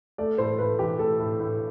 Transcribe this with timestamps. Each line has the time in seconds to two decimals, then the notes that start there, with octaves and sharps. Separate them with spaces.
0.18 A3 D5
0.38 A2 C5
0.59 A2 B4
0.79 E3 G4
0.99 A3 A4
1.19 A2
1.40 A2